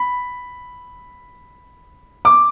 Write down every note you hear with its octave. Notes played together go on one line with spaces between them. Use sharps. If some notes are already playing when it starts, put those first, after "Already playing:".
Already playing: B5
D6